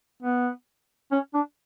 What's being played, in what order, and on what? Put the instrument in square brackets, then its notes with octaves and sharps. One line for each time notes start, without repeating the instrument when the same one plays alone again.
[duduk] B3
C#4
D4